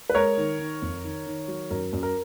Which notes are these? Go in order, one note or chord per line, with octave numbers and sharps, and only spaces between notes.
B4
G#3 A#4 C#5
D#3
D#3
F2
D#3
D#3
F#3
F#2 A#4
F#2
A#4